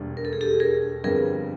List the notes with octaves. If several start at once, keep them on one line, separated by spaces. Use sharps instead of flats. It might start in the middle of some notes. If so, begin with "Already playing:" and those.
Already playing: E1 D#2 D3 G3
A#4
A4
G#4
G4 A4
G#4 A#4
G1 F2 D3 G3 B3 G#4 A#4